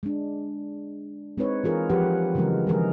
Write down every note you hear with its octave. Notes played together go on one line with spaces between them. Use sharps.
G#3 D4
G#3 C4 D#4 B4 C#5
E3 F4 G#4 A#4
F3 G4 B4 F#5
C#3 E3 F#3 G#3 A#4
D#3 F3 G#3 G#4 A#4